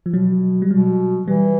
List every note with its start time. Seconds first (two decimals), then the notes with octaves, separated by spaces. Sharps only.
0.06 F3
0.13 B2 F#3
0.62 G3
0.71 B2 F#3
1.27 E3 G3